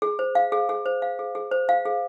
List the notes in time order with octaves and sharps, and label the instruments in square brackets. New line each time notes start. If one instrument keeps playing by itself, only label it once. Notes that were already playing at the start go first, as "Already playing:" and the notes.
[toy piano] G#4
C5
F5
G#4
G#4
C5
F5
G#4
G#4
C5
F5
G#4